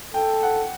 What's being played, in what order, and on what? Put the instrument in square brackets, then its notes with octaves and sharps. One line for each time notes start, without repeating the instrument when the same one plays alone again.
[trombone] A4 [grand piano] G5
[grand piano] F#5